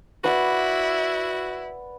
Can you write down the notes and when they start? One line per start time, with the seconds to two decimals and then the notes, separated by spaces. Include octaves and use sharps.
0.24 E4 F#4 B4 D5 F#5